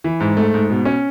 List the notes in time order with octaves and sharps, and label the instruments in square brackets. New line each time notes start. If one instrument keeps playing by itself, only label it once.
[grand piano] E3
G#2
A3
G#2
B2
C#4